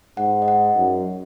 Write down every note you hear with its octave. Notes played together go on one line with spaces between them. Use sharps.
G#2 F#5
D#5
F#5
F#2